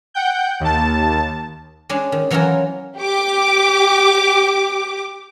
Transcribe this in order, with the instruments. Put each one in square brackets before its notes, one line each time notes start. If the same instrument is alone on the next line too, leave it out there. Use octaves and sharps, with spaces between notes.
[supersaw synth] F#5 G5 G6
D#2 A5
[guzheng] G#3 C#4 D4
D#3
E3 F#3 C#4 E4 F4 A#4
[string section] G4 D6